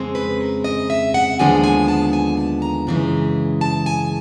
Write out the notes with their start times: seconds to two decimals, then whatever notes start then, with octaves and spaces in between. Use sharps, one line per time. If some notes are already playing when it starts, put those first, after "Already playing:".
Already playing: F2 C#3 G#3 C4
0.15 B4
0.41 A#4
0.64 D#5
0.90 E5
1.14 F#5
1.39 D#2 D3 F3 G#3 B3 G#5
1.64 G#5
1.88 A5
2.13 G#5
2.37 A5
2.62 A#5
2.87 F#2 C#3 E3 G#3
3.61 A5
3.86 G#5